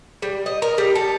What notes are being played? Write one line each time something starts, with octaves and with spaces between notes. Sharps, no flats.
G3
D#5
A#4
G3
A4